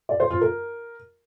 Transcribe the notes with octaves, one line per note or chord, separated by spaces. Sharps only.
D5
C5
F4
A#4